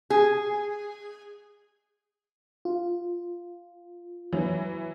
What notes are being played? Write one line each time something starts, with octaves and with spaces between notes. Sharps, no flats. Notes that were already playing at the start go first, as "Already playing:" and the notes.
G#4
F4
E3 F#3